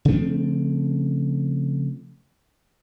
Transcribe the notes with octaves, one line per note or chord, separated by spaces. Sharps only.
C#3 F3 A3 C4